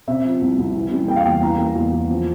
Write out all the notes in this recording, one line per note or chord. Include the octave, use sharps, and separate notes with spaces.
C3 E5
F3
C2
C2
E3
G3
A#3 G5
F5
G5
E2
E3 A#5
A#3
E2
E2
F3